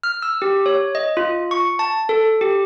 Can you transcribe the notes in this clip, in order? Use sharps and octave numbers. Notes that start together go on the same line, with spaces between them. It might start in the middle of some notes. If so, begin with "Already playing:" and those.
F6
E6
G4
C#5
D#5
F4
C#6
A5
A4
G4